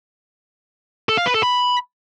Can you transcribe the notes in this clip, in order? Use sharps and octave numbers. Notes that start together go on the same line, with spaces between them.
A4
F5
B4
A4
B5